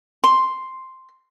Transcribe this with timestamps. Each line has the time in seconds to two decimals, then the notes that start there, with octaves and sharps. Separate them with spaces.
0.24 C6